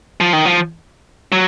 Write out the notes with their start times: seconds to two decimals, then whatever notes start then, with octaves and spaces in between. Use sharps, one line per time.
0.20 F3
0.33 D#3
0.46 F3
1.32 F#3